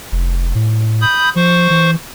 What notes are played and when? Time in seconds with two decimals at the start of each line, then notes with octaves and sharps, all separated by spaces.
0.12 F1
0.55 A2
1.01 B5 D#6 G6
1.36 F3 C5 C#6
1.70 E3